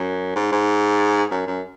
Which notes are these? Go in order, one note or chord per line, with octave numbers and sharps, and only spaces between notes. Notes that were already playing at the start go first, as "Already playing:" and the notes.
Already playing: F#2
G#2
G#2
F#2
F#2